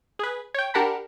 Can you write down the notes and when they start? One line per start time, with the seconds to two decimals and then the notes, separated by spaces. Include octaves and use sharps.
0.19 G#4 B4
0.54 C#5 G5
0.74 D4 G4 A#4 F#5 A5 B5